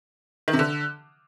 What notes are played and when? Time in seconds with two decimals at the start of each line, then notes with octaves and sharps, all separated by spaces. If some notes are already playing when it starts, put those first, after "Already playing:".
0.48 D#3
0.53 C3
0.59 D3